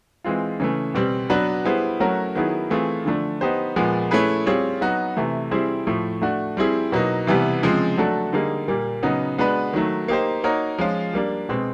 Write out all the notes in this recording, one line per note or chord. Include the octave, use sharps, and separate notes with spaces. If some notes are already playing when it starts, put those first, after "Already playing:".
E3 G#3 C4 F4
C#3 E3 A3
B2 G3 C4
F#3 B3 D4 F#4 B4
G3 B3 E4 G#4 C5
F#3 A3 C#4 F#4 A#4
D#3 F#3 B3 E4 G#4
E3 A3 C4 F4 G#4
D3 F3 A3 D4
B3 D#4 G4 C5
A#2 F3 G#3 B3
A3 C#4 E4 G#4 B4
G3 C4 F4 G#4 C#5
F#3 B3 D#4 F#4
C3 E3 A3
G3 C4 E4 G#4 C5
A2 F3 A3
A3 D4 F#4
G3 C4 E4 G#4
B2 F#3 A#3 D#4
C3 E3 G3 B3
C#3 F3 G#3 C4
F#3 A3 D4 F#4 A4
D3 G3 A#3 D#4 G#4
A#2 G3 A#3
C#3 F#3 B3 D#4
G#3 B3 D4 F#4 B4
D#3 F#3 A3
A#3 D#4 G4 C5
A#3 D#4 F#4 A#4 C#5
F3 G#3 C#4 F4
G3 A#3 D4
B2 G#3 C4